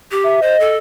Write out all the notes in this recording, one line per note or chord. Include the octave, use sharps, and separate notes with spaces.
G4
E5
C5 D#5
A4